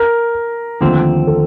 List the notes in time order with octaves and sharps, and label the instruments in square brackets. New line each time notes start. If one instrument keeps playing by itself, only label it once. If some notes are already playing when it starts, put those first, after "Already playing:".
Already playing: [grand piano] A#4
[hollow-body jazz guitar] D#2 D3 F3 A3 C4
[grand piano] A4